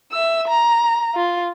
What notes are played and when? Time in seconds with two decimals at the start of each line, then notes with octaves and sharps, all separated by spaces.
0.12 E5 E6
0.48 A#5
1.15 F4